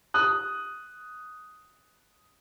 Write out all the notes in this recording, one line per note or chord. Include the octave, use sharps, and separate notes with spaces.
D#6 F#6